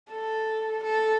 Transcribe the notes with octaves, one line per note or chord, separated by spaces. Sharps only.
A4
A4